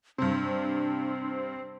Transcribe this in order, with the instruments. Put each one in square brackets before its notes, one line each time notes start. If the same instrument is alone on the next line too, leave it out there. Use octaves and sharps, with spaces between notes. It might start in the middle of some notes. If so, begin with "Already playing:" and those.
[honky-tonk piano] G2 C3 [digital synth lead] C4 [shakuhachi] D4